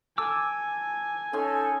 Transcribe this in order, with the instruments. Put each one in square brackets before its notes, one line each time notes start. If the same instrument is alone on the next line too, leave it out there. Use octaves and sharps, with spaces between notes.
[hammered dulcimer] A4 [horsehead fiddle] G#5 [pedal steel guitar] D6 E6
[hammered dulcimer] C#4 D#4 C6 [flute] A4